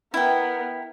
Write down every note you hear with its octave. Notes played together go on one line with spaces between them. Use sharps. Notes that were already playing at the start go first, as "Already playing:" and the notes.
B3 E4 A#4 G5